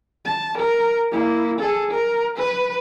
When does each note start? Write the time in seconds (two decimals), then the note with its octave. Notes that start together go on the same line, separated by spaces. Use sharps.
0.25 A5
0.57 A#4
1.11 A#3 E4
1.59 G#4 A4
1.91 A#4
2.37 B4